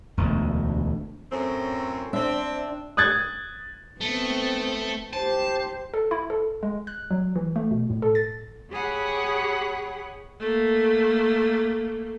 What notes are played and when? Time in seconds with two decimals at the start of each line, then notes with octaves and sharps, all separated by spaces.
0.17 E1 D2
1.32 F#2 A2 C4
2.13 C4 D4 E5
2.97 D#6 F#6 G#6 A6
4.01 A3 B3 C4
5.13 G4 C5 A5
5.94 A4
6.11 E4
6.30 A4
6.63 G#3
6.87 F#6
7.11 F#3
7.36 E3
7.56 A3
7.71 B2
7.90 A2
8.02 A4
8.15 A6
8.71 G4 G#4 C#5 F#5 B5
10.40 A3 A#3